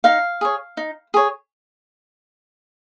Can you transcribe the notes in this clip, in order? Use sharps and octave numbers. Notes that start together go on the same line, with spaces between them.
D#4 F5
G#4 C#5
D#4
G#4 C#5